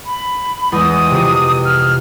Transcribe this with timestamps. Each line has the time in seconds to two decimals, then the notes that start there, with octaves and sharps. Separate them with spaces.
0.06 B5
0.72 E2 G#3 D#5 D#6
1.10 F2 C3
1.65 F6